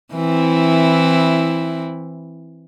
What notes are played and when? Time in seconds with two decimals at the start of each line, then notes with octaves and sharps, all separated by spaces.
0.14 E3 C4 E4